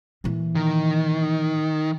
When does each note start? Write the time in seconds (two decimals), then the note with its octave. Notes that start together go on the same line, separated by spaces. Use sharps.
0.24 A#2 E3
0.56 D#3